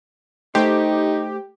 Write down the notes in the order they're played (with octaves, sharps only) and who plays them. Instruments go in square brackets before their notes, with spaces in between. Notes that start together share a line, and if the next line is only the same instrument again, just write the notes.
[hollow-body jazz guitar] A3 C5 [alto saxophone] D#4 [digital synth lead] G4